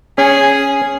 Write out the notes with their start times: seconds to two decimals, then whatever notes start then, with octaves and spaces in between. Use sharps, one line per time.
0.18 C#4 G#4